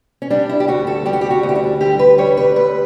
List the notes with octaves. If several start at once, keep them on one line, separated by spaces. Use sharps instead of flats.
C#4
G3 D4
E4
G4
D2 F#4
A4
G3 G4
F#4
G4
F#4
D2
E4
D4
D2 G4
B4
G3 C#5
B4
D2 B4